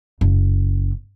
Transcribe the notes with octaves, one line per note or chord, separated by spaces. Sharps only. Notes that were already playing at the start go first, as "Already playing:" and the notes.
F#1